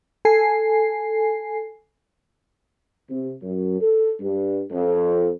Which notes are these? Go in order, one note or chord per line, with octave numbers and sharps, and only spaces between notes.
A4 G#5 C7
C3
F#2
A4
G2
F2